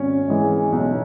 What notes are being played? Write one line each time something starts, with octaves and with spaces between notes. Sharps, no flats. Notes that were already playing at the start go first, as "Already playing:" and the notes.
Already playing: G#1 C#4
G#2 E3 G#3
B1